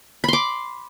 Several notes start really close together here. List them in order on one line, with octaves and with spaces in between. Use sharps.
B5 C6 D6